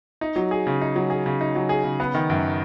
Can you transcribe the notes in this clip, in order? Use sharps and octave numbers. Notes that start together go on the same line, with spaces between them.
D#4
F#3
G#4
C#3
D#4
F#3
G#4
C#3
D#4
F#3
G#4
C#3
B3
D#3
F#2